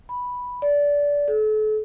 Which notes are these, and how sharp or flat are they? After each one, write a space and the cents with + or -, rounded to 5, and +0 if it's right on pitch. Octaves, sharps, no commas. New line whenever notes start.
B5 -5
D5 -20
A4 -40